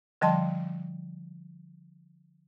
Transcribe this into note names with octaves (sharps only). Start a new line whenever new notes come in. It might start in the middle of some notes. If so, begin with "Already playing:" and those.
D3 F3 G3 D#5 A5 C6